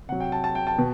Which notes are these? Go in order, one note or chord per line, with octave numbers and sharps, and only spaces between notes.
C3 F#3 F#5
G5
A5
A5
G5
A5
B2